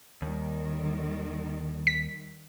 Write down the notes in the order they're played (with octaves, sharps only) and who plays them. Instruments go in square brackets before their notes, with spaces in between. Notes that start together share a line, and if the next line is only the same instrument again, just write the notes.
[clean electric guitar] D#2 [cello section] D#3 G3
[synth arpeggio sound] B6